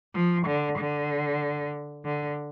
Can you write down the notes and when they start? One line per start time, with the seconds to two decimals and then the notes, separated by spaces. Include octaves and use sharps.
0.15 F3
0.46 D3
0.78 D3
2.05 D3